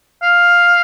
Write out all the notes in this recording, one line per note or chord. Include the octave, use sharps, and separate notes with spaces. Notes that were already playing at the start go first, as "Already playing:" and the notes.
F5